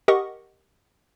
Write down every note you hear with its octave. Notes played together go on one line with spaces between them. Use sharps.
G4 A#4 D#5 F#5 C#6 D#6